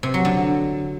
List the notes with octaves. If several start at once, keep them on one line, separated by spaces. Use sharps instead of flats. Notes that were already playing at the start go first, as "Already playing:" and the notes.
C3
F#3
D3